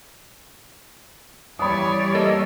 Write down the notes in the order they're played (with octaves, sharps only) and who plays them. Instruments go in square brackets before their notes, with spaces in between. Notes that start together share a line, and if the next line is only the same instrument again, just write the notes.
[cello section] E3 G3 [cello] C#5 D5 [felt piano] B5 D#6
[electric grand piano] A#3 A4 D#5